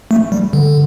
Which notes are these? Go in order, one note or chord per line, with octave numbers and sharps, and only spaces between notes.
A3
G3
D3